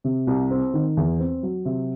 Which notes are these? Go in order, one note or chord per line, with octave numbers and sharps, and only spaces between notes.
C3
C2
C4
D#3
E2
C4
F#3
C3